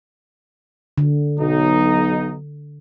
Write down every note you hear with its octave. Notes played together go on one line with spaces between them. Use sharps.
D3
B1 D#4